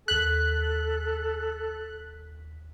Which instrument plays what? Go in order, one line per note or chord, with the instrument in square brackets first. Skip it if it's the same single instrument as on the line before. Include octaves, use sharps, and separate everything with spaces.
[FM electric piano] D#2 B6 [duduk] A4 [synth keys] F#6